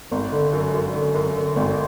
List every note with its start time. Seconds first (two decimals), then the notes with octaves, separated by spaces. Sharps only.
0.11 G#1
0.31 D3
0.53 F#2
0.74 F#2
0.95 D3
1.15 F#2
1.35 D3
1.56 G#1